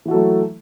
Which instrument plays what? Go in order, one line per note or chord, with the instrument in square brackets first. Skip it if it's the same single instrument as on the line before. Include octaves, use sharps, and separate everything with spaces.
[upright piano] E3
F#4
A4
F#3
A3